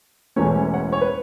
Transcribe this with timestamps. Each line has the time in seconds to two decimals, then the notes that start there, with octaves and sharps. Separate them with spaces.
0.36 E1 E2 E3 A3 C#4 C#5
0.74 C#5 F#5
0.92 C#5
1.01 B4